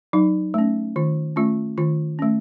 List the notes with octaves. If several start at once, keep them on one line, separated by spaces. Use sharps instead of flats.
F#3 D#4
A3 C#4
D#3 F4
A3 C#4 F4
D#3 F4
A3 C#4